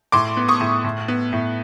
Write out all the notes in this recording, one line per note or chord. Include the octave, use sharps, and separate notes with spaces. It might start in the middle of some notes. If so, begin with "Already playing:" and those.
A2 C6 D6
B3
C#6 D#6
A2
A2
B3
A2